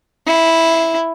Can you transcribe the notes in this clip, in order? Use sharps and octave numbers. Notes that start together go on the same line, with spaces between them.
E4